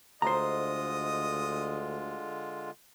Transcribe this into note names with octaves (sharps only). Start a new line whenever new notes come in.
D2 D3 G#3 F4 C5 D#5 A#5